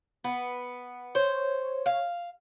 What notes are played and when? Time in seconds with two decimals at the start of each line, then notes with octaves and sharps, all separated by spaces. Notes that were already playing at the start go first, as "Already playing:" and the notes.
0.24 B3
1.15 C5 C#5
1.86 F5